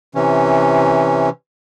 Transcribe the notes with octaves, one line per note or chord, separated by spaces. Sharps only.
C3 E3 C#4